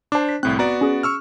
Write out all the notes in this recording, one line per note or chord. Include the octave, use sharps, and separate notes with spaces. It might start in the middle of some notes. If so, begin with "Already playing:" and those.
D4 C5 A5 D6
B6
C2 A2 C4 F#6
B3 F#4 D5 A#5
C#4 G#4
C#6 E6 F6